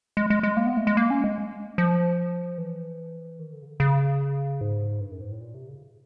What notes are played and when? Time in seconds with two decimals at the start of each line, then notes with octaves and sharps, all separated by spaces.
0.17 G#3
0.30 G#3
0.43 G#3
0.57 A#3
0.66 B3
0.77 A3
0.87 G#3
0.97 A#3
1.10 C#4
1.24 G#3
1.78 F3
2.58 E3
3.39 D#3
3.53 D3
3.62 C#3
3.66 D3
3.80 C#3
4.61 G#2
5.00 G2
5.11 F#2
5.21 G#2
5.31 A2
5.41 A#2
5.54 C3
5.68 C#3